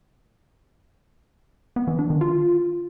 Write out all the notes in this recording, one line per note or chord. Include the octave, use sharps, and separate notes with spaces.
B3
E3
D4
D#3
F4